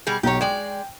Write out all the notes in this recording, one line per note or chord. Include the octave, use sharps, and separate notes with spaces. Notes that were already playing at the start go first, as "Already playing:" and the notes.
B2 G3 G#4
B1 G4 C#5 A#5
G#3 D5 G5